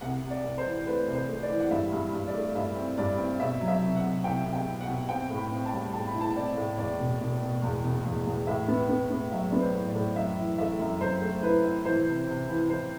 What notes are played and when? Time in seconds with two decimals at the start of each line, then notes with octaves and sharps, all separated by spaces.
0.01 C2 F#5
0.23 C3
0.30 D5
0.44 C2
0.58 C5
0.65 E3
0.86 A3 B4
1.08 C2
1.14 C5
1.29 A3
1.43 D5
1.50 E3
1.60 F#5
1.71 G2 E5
1.92 G2
2.13 G2
2.27 D5
2.34 A3
2.55 G2 E5
2.76 C4
2.97 G2 D5
3.18 C4
3.40 B2 E5
3.61 F#3
3.68 E5
3.82 C2
3.96 F#5
4.03 C2
4.24 C2 G5
4.46 C2
4.53 G5
4.67 B2
4.81 F#5
4.87 B2
5.09 C4 G5
5.30 A2
5.37 B5
5.51 C4
5.65 A5
5.73 G3
5.93 A2 A5
6.07 B5
6.15 E4
6.21 A5
6.35 C4 D5
6.57 A2
6.78 E2 D5
6.99 E1
7.20 E1
7.41 B2
7.62 E2
7.83 E1
8.05 E2
8.26 E2
8.47 A2 E5
8.68 B3
8.89 B3
9.10 B3
9.32 F#3 E5
9.50 B3 D5
9.60 C5
9.74 A2
9.88 D5
9.95 A2
10.16 F#2 E5
10.38 E3
10.58 A3 E5
10.80 F#2
11.01 F#2 C5
11.21 A3
11.43 E4 B4
11.64 E4
11.85 E3 C5
12.06 C3
12.27 C3
12.49 E3
12.70 E3 C5